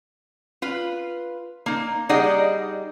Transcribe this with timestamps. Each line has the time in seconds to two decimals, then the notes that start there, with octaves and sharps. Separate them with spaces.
0.62 F4 B4
1.66 A#3 D#4
2.09 G3 D#4 G#4 D5 D#5 F#5